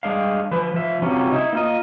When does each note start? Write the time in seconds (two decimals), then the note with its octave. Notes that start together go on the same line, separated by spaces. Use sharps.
0.03 G3 G#3 D4 F5
0.51 F3 B4
0.74 F3 E5
1.02 C3 F#3 G3 C#4 F4
1.31 D#4 E4
1.53 A#3 F4 D#5